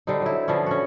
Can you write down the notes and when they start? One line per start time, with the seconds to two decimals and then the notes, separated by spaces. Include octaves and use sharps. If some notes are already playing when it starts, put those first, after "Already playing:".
0.07 D3 G3 C4 D#4
0.22 F#3 E4
0.48 D3 F3 B3 C#4
0.66 C#4 F#4